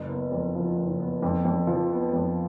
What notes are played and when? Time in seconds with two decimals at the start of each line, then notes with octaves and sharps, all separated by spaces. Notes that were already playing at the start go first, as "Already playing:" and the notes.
Already playing: F#1
0.09 B3
0.32 F2
0.55 F3
0.78 F#1
1.00 B3
1.23 F2
1.45 F2
1.67 F3
1.90 B3
2.13 F2